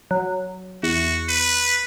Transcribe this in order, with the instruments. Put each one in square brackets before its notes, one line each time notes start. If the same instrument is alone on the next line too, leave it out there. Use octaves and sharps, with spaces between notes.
[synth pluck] F#3
[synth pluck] E2 [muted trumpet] F#4
[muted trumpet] B4